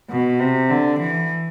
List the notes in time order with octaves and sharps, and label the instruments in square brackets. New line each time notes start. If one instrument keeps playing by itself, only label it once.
[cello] B2
C3
D3
E3